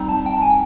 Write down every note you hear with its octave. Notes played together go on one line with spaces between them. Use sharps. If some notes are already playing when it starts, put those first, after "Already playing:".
Already playing: G3 C4 D#4 A#5
A5
G5
A5
G#5
G5